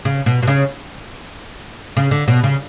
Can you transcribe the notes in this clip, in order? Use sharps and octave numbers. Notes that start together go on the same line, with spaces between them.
C#3
B2
B2
C#3
C#3
D3
B2
C#3